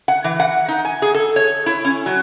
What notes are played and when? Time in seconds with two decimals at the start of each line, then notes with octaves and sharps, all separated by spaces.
0.08 F#5
0.24 E3
0.40 F#5
0.68 D#4
0.85 G#5
1.02 G#4
1.14 A4
1.36 C#5
1.66 E4
1.85 C#4
2.06 F#3